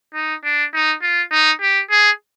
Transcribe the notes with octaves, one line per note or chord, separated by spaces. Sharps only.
D#4
D4
D#4
F4
D#4
G4
G#4